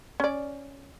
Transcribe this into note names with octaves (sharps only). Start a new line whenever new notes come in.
C#4 D5